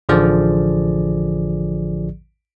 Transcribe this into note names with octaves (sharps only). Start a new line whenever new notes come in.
A1 D3 F3 G#4 D5